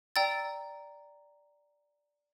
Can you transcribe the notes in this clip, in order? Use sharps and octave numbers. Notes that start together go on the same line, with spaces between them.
D5 G5 A#5 E6 A6